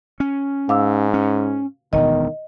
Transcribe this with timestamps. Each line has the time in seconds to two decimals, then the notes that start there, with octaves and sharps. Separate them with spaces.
0.20 C#4
0.69 G#2 F5 D6 E6
1.14 C#4
1.93 E1 D2 B2 D#3 D#5